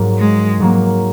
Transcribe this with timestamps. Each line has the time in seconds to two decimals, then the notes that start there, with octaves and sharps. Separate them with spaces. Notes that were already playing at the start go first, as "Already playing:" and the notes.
Already playing: G#2 F#3 A#3
0.18 G#3
0.60 G#2 F#3 A#3